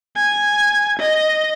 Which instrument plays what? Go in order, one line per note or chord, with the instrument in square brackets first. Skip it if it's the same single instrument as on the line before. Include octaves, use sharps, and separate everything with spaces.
[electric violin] G#5
D#5